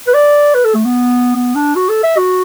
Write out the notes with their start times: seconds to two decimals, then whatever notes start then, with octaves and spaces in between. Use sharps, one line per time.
0.07 B4
0.14 D5
0.54 B4
0.65 A4
0.75 A3
0.85 B3
1.35 B3
1.55 D4
1.76 F#4
1.89 A4
2.03 E5
2.17 F#4